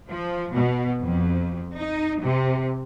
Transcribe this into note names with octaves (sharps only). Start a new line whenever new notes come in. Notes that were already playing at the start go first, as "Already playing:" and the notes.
F3
B2
F2
D#4
C3